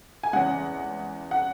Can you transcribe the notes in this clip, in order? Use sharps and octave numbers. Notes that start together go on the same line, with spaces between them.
G#5
E2 C#3 G#3 F#5
F#5